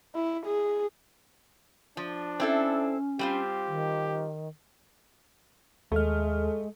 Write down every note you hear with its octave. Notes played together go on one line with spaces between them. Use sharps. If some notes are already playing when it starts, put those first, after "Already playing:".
E4
G#4
F3 D4
C4 C#4 E4 A4
G3 C4 F4 G4
D#3
D#2 G#3 A3 F6